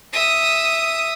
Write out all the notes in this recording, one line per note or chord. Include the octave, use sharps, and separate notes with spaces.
E5 D#6